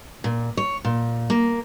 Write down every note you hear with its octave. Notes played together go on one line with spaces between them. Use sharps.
A#2
C#5
A#2
A#3